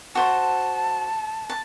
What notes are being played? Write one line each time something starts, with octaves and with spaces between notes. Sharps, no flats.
F#4 C5 A5
A5